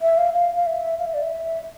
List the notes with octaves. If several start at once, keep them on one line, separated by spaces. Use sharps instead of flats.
E5
F5
F5
F5
E5
F5
E5
D5
E5